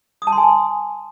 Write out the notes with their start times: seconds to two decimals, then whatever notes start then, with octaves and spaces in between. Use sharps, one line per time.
0.22 D#6
0.27 A5
0.32 C6
0.38 G#5